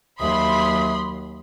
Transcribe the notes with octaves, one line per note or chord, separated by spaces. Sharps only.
D#2 F#3 E5 B5 C6 D#6